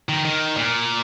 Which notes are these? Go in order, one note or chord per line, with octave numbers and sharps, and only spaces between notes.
D#3
D#3
A#2